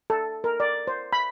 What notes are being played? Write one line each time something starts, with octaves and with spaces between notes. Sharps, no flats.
A4
A#4
D5
C5
B5